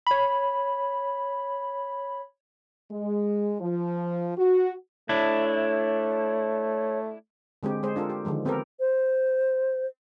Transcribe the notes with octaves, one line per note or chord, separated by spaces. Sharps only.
C#5 B5
G#3
F3
F#4
A3 D4 E4 C#5
D3 G#3 C4 G4
G#3 G#4 C5
D4 F4 A4 A#4
G4
D3 D#3 F3 G#3
B3 C4 G4 A4 A#4
C5